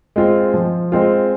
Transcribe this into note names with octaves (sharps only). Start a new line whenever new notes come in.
G#3 C4 F4
F3
G#3 C4 F4